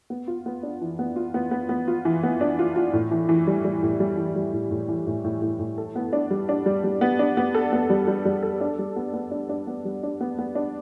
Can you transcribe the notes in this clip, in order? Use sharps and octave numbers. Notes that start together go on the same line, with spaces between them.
B3
F4
B3
D4
E3
B3
F4
B3
B3
B3
F4
E3
B3
D4
F4
F4
A2
E3
E3
G3
G3
A2
G3
E3
G3
A2
A2
E3
A2
A2
A2
A2
A4
B3
D4
G3
D4
G3
G3
B3
D4
B3
A4
B3
G3
G3
G3
A4
D4
G3
B3
B3
D4
D4
B3
G3
D4
B3
B3
D4